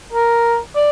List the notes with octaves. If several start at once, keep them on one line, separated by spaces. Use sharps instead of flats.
A#4
D5